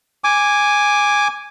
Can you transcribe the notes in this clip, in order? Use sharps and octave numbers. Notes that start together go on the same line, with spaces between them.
G#5 D6